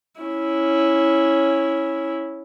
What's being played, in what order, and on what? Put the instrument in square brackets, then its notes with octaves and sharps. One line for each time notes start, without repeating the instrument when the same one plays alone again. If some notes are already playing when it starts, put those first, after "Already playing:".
[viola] C#4 E4